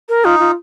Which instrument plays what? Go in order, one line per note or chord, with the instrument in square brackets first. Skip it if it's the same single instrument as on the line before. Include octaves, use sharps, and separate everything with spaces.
[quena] A#4
[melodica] D#4 [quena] F4
[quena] F4